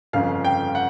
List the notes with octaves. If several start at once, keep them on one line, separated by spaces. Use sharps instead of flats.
G1 F2 C#3 F5
G5
F#5